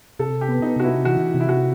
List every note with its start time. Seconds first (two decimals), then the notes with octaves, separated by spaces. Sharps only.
0.19 C3 A4
0.41 G4
0.49 B3
0.62 D#4
0.76 C3 F#4
0.84 E4
1.05 E3 F#4
1.34 C3
1.40 E4
1.49 F#4